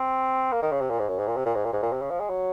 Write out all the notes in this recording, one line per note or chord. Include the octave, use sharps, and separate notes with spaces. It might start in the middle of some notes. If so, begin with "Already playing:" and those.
Already playing: C4
A#3
D#3
C#3
C3
A#2
G#2
F#2
G#2
A#2
C3
A#2
G#2
A#2
G#2
A#2
C3
C#3
F3
G#3
F#3